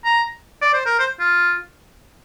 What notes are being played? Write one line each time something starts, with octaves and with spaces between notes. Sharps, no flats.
A#5
D5
C5
A#4
C5
F4